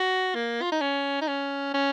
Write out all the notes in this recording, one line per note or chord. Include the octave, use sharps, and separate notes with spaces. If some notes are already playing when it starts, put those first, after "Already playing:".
Already playing: F#4
A#3
F4
D#4
C#4
D#4
C#4
C#4